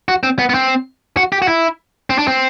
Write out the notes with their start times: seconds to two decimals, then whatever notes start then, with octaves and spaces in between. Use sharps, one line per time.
0.08 F#4
0.23 C4
0.39 B3
0.49 B3
0.54 C4
1.17 F#4
1.32 G4
1.42 F#4
1.48 E4
2.10 C4
2.18 D4
2.28 C4